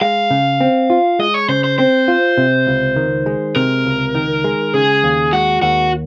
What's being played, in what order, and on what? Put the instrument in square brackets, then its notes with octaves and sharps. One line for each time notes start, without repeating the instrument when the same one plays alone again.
[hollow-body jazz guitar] G#3 [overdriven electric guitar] F5
[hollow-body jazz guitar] C#3
C4
F4
[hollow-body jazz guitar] G#3 [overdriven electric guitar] D#5
[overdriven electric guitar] C#5
[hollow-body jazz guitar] C#3 [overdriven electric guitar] C5
[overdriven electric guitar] C5
[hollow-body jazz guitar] C4 [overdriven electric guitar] C5
[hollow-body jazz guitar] F4
C3
C#2
D#3
G#3
[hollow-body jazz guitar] C3 [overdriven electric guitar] A#4
[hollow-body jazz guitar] C#2
D#3
G#3
[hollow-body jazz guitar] C#3 [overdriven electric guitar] G#4
[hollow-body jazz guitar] D#2
[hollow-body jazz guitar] G#3 [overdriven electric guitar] F#4
[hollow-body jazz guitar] D#2 [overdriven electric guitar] F#4